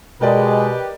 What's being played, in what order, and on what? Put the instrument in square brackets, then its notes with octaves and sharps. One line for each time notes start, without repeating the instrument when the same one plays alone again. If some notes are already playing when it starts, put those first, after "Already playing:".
[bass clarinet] B2 [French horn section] G#3 [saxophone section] G4 B4 [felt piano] A#4 D5 D#5